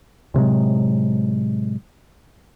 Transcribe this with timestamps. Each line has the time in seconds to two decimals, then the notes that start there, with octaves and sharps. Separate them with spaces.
0.34 A2 C3 F#3 G#3